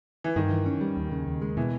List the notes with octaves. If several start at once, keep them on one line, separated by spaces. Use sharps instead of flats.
E3
G2 D#3
E3
C#4
G3
D#2
C#3
D#2
G#3
B2 E3